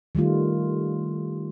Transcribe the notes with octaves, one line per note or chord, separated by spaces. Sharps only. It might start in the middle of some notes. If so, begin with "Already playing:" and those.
D#3 G3 A3 F4